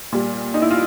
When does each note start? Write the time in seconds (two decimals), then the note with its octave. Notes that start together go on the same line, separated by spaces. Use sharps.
0.12 A#2 G3
0.54 D#4
0.62 E4
0.71 F4